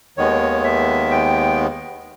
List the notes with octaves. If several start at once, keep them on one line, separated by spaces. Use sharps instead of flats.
D#2 D#3 G#3 B3 C#5
E5
G5